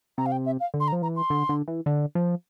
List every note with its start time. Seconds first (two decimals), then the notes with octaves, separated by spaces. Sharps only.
0.18 C3 A#5
0.26 F5
0.32 G5
0.46 E5
0.60 F5
0.74 D3
0.80 C6
0.88 A#5
0.92 F3
1.02 E3 A#5
1.16 C6
1.30 D3
1.49 D3
1.68 E3
1.86 D3
2.15 F3